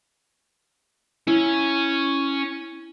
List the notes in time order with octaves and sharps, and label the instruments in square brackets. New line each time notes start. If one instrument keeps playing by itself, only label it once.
[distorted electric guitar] C#4 [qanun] E4